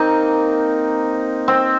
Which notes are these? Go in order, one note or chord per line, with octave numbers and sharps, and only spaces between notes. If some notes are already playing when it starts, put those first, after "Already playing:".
Already playing: A#3 C4 D#4
C4